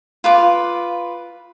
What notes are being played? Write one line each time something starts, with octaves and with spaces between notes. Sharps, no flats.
F4 B4 D6